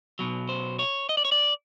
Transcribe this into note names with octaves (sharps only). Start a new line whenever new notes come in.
B1 B2 F#3
C5
C#5
D#5
D5
C#5
D5